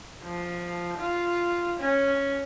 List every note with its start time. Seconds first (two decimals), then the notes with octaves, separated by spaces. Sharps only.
0.23 F3
0.98 F4
1.79 C#4